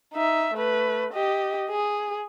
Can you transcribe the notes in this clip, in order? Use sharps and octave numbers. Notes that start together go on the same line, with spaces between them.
D#4 E5
A3 B4
G4 D#5
G#4